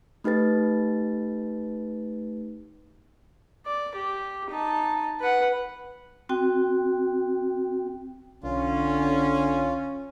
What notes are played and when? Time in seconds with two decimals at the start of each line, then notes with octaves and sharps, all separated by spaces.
0.24 A3 D#4 G4 B4 A6
3.66 D5
3.95 G4
4.50 D#4 A5
5.20 B4 F#5
6.29 C4 F#4 G5
8.43 B1 D3 C#4 F4